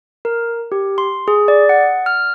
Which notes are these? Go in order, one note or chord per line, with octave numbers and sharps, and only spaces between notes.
A#4
G4
C6
G#4
D5
F#5
F6